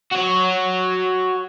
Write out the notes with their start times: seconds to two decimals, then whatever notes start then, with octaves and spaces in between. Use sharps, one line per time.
0.11 F#4 C#5